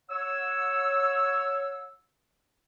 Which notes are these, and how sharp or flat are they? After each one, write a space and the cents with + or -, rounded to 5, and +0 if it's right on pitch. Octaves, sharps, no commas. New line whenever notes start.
C#5 +0 F#5 -35 E6 +0